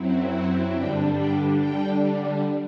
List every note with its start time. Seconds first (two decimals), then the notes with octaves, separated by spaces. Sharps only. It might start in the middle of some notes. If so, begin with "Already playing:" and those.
Already playing: F#2 F#3 C4 E4
0.31 F#5
0.73 G2 D3 G3 D4 G5
1.15 G5
1.57 D3 G3 D4 G5